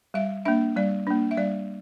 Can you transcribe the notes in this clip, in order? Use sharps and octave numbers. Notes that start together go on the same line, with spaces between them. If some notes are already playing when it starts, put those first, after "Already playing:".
G3 E5
A#3 D4 E5
G3 D5
A#3 D4
E5
G3 D5